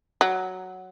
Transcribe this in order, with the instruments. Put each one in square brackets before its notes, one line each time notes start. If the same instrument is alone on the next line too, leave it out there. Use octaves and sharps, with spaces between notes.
[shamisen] F#3